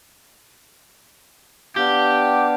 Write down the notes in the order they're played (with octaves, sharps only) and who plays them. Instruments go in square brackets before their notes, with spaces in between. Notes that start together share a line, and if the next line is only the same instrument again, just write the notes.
[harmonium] B3 D4 F5 [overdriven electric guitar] G4